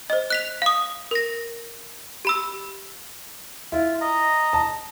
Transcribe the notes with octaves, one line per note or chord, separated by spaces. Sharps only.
C5 D#5
F#6 B6 F7
F5 D#6
A#4 A#6
G4 B5 E6
E4 F4
D#5 A#5
A5